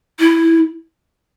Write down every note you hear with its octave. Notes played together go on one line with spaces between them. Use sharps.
E4